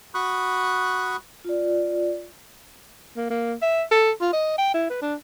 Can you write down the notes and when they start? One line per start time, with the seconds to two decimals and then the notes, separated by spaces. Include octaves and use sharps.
0.14 F#4 B5 C#6 D#6 F#6
1.44 F4 D5
3.17 A#3
3.30 A#3
3.62 E5
3.91 A4
4.21 F4
4.33 D#5
4.58 G5
4.74 E4
4.90 B4
5.02 D4